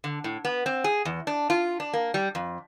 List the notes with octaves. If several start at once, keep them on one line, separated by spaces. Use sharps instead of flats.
D3
A2
B3
C4
G#4
E2
D4
F4
D4
A#3
G3
F2